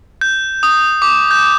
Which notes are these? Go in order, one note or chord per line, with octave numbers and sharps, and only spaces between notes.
G6
D#6
D6
G6